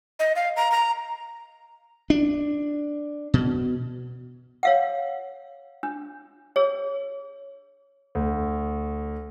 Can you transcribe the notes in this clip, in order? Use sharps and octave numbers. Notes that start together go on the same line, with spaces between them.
D#5
F5
A#5
A#5
D4
B2
C#5 F5 F#5
D4
G#4 C#5
D2